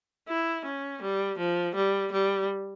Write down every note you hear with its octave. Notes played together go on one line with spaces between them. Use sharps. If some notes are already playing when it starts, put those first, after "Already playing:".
E4
C#4
G3
F3
G3
G3